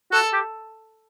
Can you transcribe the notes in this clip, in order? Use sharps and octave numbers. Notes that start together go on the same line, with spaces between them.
F#4 A4
G4